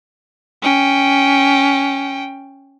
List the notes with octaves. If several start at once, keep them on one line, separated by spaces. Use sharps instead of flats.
C#4 G5